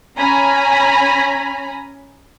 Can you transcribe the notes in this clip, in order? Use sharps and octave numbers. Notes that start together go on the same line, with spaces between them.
C#4 G#5 A#5 B5